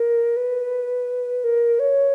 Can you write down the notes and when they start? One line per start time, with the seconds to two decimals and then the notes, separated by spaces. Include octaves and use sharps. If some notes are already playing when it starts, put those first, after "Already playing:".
Already playing: A#4
0.37 B4
1.44 A#4
1.79 C#5